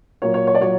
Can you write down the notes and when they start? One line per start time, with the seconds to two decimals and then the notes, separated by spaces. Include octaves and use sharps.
0.22 A#2 F#3 A#3 C#5
0.34 C#5
0.47 C#5
0.55 D5
0.60 A#2 F#3 A#3 C#5